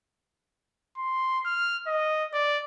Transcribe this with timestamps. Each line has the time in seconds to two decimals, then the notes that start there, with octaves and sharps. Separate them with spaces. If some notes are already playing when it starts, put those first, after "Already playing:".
0.98 C6
1.45 F6
1.87 D#5
2.34 D5